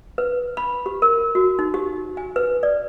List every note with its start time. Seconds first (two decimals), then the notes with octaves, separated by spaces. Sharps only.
0.18 B4
0.57 B5
0.86 G4
1.02 A#4
1.35 F#4
1.59 D#4
1.74 G4
2.17 G#5
2.36 B4
2.63 D5